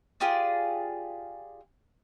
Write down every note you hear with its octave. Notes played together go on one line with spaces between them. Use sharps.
F4 G4 G#4 D5